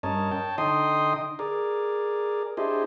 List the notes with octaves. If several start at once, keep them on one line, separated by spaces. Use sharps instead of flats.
G2 C#4 A#4 C#5 D#5 A5
C#5 G5 A5
D3 D#4 D#5 G5 C6 D#6
G#4 A#4 D5
D4 E4 G4 G#4 C5 D#5